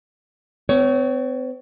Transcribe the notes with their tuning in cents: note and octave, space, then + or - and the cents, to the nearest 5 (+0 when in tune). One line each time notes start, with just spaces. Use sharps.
C4 -40 C#5 +15